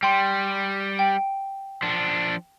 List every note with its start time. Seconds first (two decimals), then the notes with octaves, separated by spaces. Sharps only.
0.03 G3 G5 C6
0.99 G5
1.82 F3 D4